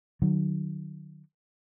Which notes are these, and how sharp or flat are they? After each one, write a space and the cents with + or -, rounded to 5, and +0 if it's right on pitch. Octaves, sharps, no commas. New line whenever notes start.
D#3 -45 F#3 +0